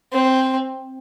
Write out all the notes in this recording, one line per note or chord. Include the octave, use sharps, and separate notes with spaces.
C4